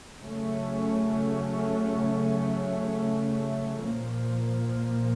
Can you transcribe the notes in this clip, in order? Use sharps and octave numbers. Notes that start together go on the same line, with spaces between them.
C#3 F#3 A3 C#4
A#2 F3 A#3